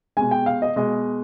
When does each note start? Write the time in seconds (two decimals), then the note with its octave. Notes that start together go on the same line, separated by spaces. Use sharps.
0.17 B2 G#3 G#5
0.31 G5
0.46 F5
0.62 D#5
0.76 B2 G#3 D#5